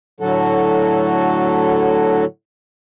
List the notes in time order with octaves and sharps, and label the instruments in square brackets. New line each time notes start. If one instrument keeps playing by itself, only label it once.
[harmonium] A2 D3 F#3 F#4 A4